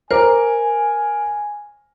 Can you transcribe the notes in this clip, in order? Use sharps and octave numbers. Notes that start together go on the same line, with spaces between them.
A#4 C5 G#5 A#5 D6